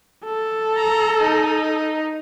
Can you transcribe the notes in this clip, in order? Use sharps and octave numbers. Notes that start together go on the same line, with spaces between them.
A4
A#5
D#4